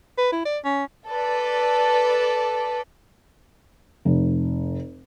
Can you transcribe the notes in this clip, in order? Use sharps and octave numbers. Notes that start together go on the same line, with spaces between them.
B4
E4
D5
C#4
A4 B4 D5
F1